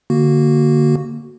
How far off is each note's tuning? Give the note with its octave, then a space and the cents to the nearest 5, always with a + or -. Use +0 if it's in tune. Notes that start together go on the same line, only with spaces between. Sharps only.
D3 +10 A#3 +0 F#4 +0